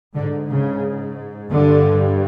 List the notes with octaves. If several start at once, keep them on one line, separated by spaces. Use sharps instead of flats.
G#2 D3
C#3
G2 D3